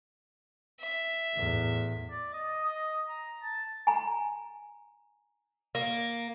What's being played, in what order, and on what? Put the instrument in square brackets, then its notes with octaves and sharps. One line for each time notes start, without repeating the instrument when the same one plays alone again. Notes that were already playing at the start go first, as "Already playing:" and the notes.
[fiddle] E5
[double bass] E2 A2
[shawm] D5
D#5
D#5
A#5
A5
[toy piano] G#5 A#5
[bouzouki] A#3